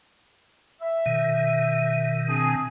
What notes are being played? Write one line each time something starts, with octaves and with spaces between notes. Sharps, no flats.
E5
B2 D#3
C4 D4 G#4